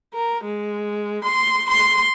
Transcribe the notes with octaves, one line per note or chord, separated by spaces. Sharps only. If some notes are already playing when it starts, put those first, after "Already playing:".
A#4
G#3
C6
C6